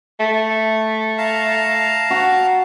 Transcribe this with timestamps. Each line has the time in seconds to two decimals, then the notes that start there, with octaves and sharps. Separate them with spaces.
0.20 A3
1.18 F5 A5 A#5
2.10 F#4